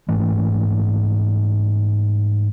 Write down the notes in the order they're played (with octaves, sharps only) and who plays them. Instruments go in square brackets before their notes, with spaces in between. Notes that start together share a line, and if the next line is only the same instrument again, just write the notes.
[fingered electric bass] G#2 E3 A3